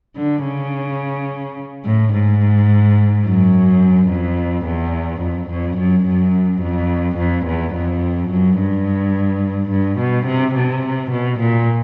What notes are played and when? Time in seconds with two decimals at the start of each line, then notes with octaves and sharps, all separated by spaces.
0.16 D3
0.44 C#3
1.85 A2
2.13 G#2
3.25 F#2
4.09 F2
4.66 E2
5.22 F2
5.50 F2
5.78 F#2
6.07 F#2
6.63 F2
7.19 F2
7.47 E2
7.75 F2
8.31 F#2
8.59 G2
9.71 G2
9.99 B2
10.27 C3
10.56 C3
11.12 B2
11.40 A#2